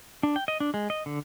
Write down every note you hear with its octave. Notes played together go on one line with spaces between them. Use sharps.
D4
G5
D#5
D4
G#3
D#5
D3